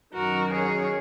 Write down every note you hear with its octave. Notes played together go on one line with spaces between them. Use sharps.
F#2 D#3 F#4 A#4
G#4 C#5